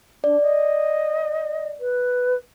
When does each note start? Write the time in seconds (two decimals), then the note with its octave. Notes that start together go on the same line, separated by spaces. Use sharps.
0.24 D4 D5
0.41 D#5
1.80 B4